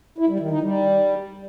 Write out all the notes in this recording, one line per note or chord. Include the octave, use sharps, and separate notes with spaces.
E4
G3
D#3
D#4
G3